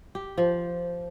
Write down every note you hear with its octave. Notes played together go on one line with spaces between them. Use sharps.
G4
F3